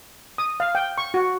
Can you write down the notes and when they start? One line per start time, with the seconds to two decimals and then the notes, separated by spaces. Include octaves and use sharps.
0.38 D#6
0.60 F5
0.75 G5
0.98 C#6
1.14 F#4